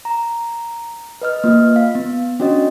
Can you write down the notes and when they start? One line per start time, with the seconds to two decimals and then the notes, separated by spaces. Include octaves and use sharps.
0.05 A#5
1.22 B4 D#5 F6
1.44 A#3 F4 D#5
1.76 F5
1.95 B3
2.40 C#4 D4 F#4 C#5 D#5